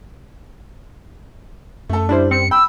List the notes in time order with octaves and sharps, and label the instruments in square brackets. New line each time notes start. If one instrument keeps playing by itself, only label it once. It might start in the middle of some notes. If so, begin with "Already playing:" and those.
[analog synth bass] F#2 [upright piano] A3 A4
[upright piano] G3 [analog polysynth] D4 E4 C5
[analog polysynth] C4 [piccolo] C#7
[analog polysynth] G5 [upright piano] B5 [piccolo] E6